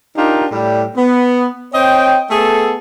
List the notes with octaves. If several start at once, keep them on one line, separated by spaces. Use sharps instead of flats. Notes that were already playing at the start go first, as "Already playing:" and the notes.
D4 D#4 F4 G4 A#4
A2 G3
B3
C4 C#5 D#5 G5
A3 B3 G#4 A4